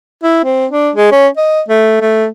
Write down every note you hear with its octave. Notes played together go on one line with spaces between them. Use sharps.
E4
C4
D4
G#3
C#4
D#5
A3
A3